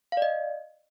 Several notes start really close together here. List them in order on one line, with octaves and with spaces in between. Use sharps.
F5 D5 D#5